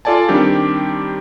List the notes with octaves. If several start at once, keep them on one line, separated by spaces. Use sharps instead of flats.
F4 A4 D5 G#5 A5
D#3 G3 C4 D4 G4